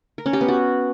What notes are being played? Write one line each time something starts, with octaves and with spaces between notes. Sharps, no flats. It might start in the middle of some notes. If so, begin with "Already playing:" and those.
A#4
C#4
G4
B3
F#4